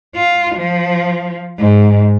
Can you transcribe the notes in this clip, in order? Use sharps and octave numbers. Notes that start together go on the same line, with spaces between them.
F4
F3
G#2